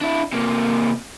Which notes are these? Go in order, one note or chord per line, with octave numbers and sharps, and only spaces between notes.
D4 E4
C3 A#3